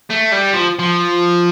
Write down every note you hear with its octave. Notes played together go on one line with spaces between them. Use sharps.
A3
G3
F3
F3